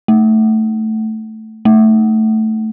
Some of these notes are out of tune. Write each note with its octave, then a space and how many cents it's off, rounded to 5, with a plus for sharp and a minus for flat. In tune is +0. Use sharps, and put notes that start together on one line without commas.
A3 +0
A3 +0